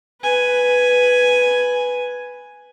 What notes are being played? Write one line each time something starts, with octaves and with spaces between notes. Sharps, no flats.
B4 G#5